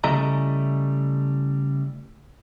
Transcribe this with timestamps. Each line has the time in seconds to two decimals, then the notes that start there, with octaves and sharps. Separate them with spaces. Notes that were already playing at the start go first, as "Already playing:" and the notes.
0.04 C#3 G3 A3 E4 D#5 A#5